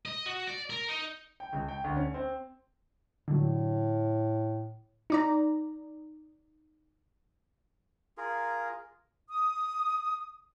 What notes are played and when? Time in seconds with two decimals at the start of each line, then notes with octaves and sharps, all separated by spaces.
0.06 D#5
0.26 F#4
0.47 D5
0.70 A#4
0.89 D#4
1.40 G5
1.53 C#2
1.68 G5
1.84 D2
1.97 C#4
2.14 C4
3.28 A2 D3 F#3
5.10 D#4 D5 A#5
8.17 F4 G#4 A#4
9.28 D#6